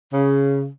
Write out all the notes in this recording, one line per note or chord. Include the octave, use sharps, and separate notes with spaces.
C#3